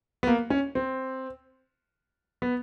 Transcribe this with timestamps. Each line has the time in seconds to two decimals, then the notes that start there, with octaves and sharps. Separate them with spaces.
0.23 B3
0.27 A#3
0.50 C#4
0.75 C4
2.42 B3